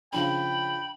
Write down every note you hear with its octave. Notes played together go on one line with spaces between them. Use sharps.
C#3 F3 D4 G5 B5